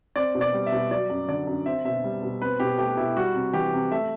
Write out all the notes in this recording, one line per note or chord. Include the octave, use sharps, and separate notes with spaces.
C4 D5
B2
D5
G3
E5
B2
F#3 D5
F#2
D3 D5
F#2
C4 E5
B2 E5
G3
B2
C4 B4
B2 G4
A3 G4
B2 E4
G3 F#4
C3
E3 G4
C3
A3 E5